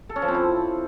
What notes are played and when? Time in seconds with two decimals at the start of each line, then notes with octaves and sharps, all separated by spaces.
0.09 A4
0.16 C#4
0.22 F3
0.28 C4
0.35 E4